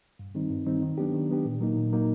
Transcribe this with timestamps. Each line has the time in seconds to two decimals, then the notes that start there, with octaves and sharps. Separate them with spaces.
0.19 G2
0.35 D#3 G3 C4 D#4
0.50 G2
0.66 D#3 G3 C4 D#4
0.82 D#3
0.98 F#3 B3 D4 G4
1.14 D#3
1.29 F#3 B3 D4 G4
1.45 A#2
1.61 F#3 A#3 D#4
1.76 A#2
1.92 F#3 A#3 D#4